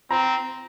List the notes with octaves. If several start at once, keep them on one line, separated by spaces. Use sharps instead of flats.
C4 A#5